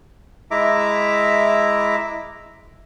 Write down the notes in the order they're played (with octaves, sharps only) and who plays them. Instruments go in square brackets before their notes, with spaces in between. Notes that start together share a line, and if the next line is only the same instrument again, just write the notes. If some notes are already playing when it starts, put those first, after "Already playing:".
[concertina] G#3 E4 E5 A#5 D6